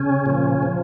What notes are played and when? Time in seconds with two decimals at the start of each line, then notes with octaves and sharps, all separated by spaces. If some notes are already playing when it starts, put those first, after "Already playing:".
Already playing: C#3 C#4
0.26 A#2 F3
0.63 F3